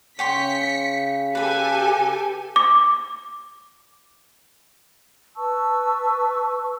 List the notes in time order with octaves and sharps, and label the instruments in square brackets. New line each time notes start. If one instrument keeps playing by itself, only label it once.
[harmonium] C#3 [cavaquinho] C#5 G5 C6 [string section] B6 C#7
[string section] G4 A4 G#5 [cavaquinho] B4 B5
[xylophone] D6
[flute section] B4 A5 C#6 E6